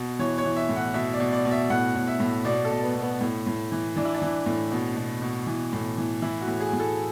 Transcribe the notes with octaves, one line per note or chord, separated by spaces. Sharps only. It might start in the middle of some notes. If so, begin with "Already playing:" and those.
Already playing: B2
E3 C#5
C#5
E3
E5
A2
F#5
B2 E5
D5
B2
D5
B2
E5
A2 F#5
A2
E5
A2
B2 D5
A4
B2
B3
B2
B3
A2
A2
E3
E3 D4
E4
D4
E3
A2
B2
B2
B2
E3
A2
E3
E3 E4
F#4
A2
G#4
A2
A4